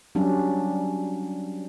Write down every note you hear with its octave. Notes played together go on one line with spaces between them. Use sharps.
F#3 G3 C#4 D4